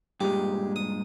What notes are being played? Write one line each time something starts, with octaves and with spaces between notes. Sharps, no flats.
G2 A#2 G#3 G4
D#6